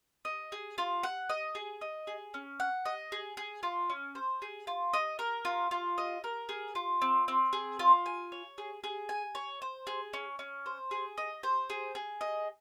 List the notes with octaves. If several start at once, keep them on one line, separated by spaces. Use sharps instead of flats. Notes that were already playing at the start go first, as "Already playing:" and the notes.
D#5
G#4
F4
F#5
D#5
G#4
D#5
G#4
C#4
F#5
D#5
G#4
G#4
F4
C#4
C5
G#4
F4
D#5
A#4
F4
F4
D#5
A#4
G#4
F4
C4
C4
G#4
F4
G#5
C#5
G#4
G#4
G#5
C#5
C5
G#4
C#4
C#4
C5
G#4
D#5
C5
G#4
G#4
D#5